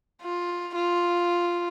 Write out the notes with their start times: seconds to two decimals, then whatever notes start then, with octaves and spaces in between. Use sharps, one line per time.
0.23 F4
0.75 F4